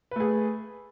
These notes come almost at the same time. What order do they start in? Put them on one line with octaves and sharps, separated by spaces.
B4 A3 G#4